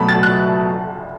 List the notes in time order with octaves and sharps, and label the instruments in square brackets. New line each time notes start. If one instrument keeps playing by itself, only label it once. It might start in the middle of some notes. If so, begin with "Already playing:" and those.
Already playing: [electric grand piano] B2 F#3 A3 [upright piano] A5 B5
[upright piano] A6
F#6